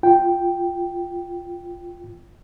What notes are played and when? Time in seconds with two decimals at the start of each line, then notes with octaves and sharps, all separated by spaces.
0.03 F4 G5